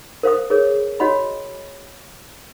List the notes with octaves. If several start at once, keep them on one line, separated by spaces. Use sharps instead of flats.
A#4 C5 F5 F#5 D#6
G#4 A#4 C#5
F#4 C#5 D#5 F#5 B5